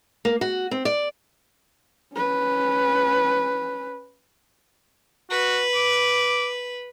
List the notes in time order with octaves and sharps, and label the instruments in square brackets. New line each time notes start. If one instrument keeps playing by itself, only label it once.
[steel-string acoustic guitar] A#3
F#4
C4
D5
[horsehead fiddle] C#4 B4
[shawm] F#4 [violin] B4
[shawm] D6